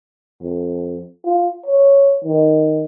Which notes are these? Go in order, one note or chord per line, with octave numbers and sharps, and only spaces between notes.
F2
F4
C#5
D#3